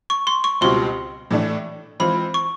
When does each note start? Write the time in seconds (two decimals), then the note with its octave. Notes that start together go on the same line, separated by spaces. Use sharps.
0.10 C#6
0.27 C6
0.44 C#6
0.61 C#2 B2 G3 C4 F4 C6
1.30 A2 E3 A3 D4
2.00 E3 G#3 C4 F4 B5
2.34 C#6